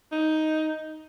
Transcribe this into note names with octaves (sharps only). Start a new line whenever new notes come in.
D#4